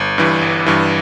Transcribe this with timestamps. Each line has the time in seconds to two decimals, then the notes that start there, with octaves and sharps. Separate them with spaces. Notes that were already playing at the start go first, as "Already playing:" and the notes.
Already playing: G1
0.18 G2 E3
0.41 G1
0.66 G2 E3